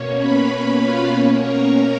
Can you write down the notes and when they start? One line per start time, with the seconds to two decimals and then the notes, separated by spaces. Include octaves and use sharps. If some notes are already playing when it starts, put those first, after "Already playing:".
Already playing: B2 A#3 C#4 C#5
0.18 B4 B5
0.80 F4 F5
1.10 B2 A#3 C#4 C#5
1.41 A#4 A#5